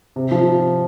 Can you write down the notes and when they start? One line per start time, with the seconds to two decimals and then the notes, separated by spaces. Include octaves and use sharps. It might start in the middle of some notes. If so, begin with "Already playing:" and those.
0.16 C3
0.32 F3